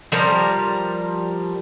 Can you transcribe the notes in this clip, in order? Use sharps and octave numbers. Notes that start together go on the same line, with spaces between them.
F3 G3 A#4 D5